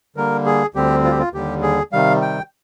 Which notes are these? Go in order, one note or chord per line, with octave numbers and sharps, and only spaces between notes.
D3 G3 A#3 A#4
G#4
D2 D3 G3 C4 G4
F4
G4
F4
D#2 D3 G3 G4
G#4
C3 D#3 G3 F5
G5